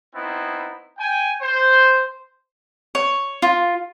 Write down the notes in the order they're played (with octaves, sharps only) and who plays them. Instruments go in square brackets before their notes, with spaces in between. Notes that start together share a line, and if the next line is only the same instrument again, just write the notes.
[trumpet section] B3 C4 D#4 E4
G5 G#5
C5
[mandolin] C#5
F4